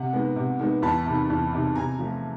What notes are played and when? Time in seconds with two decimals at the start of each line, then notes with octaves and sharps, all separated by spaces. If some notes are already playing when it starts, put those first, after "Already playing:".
Already playing: C3 F#5
0.13 D#3 G#3 B3
0.36 C3
0.59 D#3 G#3 B3
0.82 E2 A5 B5
1.06 C3 D#3
1.30 E2
1.53 C3 D#3
1.75 C3 G#5 A#5
1.99 F3 A3